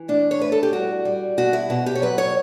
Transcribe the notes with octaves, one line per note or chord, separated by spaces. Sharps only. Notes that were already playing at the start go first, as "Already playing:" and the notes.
Already playing: E3
A2 D4
C#5
A2 B4
A4
G4
G3 F#4
G3
B2 F#4
E4
B2 F#4
G4
C#5
F#3 B4
C#5